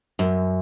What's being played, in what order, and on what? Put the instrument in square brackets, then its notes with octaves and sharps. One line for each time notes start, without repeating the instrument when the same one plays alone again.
[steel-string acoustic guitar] F#2